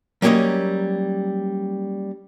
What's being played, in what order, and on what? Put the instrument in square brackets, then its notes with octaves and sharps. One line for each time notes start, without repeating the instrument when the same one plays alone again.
[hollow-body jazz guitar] F#3 G3 A#3 C4 C#4 D#5